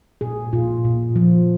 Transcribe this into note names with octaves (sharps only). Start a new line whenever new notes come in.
A#2 G#4
A#2 F4
A#2
F3